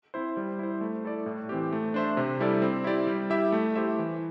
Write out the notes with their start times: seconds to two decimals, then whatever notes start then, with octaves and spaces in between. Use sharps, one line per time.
0.14 C4 E4 C5
0.37 G3
0.59 E4 C5
0.81 A3
1.04 E4 A4 D5
1.26 A2
1.49 E3 C4 G4
1.73 A3
1.94 D4 C5 E5
2.17 C3
2.40 G3 E4 A4 D5
2.62 C4
2.84 E4 G4 D5
3.07 G3
3.30 E4 G4 E5
3.52 A3
3.75 E4 G4 C5 E5
3.99 E3